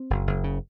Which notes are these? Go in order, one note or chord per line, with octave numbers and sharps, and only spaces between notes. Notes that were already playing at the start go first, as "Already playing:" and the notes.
Already playing: C4
F#1
F#1
C#3